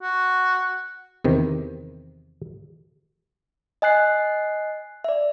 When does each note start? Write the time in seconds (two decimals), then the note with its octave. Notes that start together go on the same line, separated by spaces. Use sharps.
0.02 F#4
1.24 E2 C3 D#3
3.82 D#5 G#5 F#6 C7
5.04 D5 E5